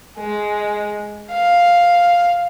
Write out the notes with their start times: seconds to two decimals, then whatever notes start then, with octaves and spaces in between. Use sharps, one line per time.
0.18 G#3
1.31 F5